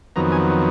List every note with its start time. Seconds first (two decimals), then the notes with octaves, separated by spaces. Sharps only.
0.16 F2 D#3 F#3 B3 A#5
0.32 G#5